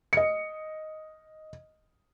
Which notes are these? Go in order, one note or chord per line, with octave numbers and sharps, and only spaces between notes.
D#5 C#7